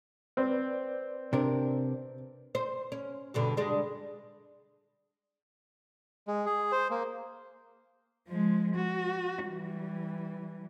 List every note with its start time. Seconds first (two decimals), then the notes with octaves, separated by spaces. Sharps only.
0.37 C4 B4 C5 D5
1.33 C3 D4 A#4
2.55 C5
2.92 C#4
3.34 G2 B2 D3
3.57 G3 G#3 D4
6.28 G#3
6.46 G#4
6.72 C5
6.91 A#3
8.28 F3 G#3
8.75 F#4
9.45 E3 G3